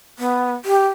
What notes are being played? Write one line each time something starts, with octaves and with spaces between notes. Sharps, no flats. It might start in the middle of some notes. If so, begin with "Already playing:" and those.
B3
G4